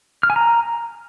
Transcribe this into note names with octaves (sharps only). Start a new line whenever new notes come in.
F6
G#5
A#5